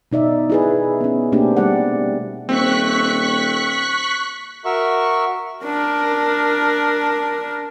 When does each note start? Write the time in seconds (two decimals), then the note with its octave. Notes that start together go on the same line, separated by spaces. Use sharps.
0.12 B2 D#4 D5 E5
0.50 E4 G#4 B4
1.01 B3 C#4
1.32 B2 A3 A#3 C4 D4 G4
1.57 G3 D5 F#5
2.49 D#1 C4 C#6 F#6 B6
4.65 F#4 A#4 E5 C#6
5.64 D4 A#4